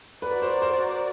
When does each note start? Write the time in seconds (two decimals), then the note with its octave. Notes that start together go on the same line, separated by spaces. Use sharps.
0.22 F#4 A#4 B4 D5
0.42 C5
0.62 C5